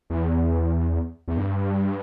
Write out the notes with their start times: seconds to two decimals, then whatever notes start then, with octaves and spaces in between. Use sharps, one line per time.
0.10 E2
1.28 E2
1.37 G2